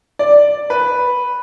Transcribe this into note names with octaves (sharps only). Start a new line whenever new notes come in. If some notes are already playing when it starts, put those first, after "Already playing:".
D5
B4